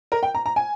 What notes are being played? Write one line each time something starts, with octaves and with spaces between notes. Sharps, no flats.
A#4
G5
A#5
A#5
G#5